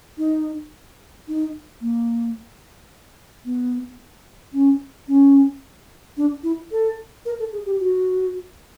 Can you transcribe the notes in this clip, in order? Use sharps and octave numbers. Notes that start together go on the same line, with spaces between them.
D#4
D#4
A#3
B3
C#4
C#4
D4
E4
A4
A#4
A4
G#4
G4
F#4